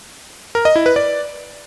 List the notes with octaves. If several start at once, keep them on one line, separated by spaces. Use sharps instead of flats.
A#4
D#5
E4
B4
D5